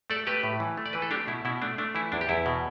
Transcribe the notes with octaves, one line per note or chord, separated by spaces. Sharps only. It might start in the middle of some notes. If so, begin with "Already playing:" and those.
A3 A4 D5
A3 G4 B4
A2
E3
A3
D5
E3 B4
A4
A3 D4 G4
B2 E4
B2 E4
A3 D4
A3 D4
E3 E4
E2 D4
G4
E2 E4
B2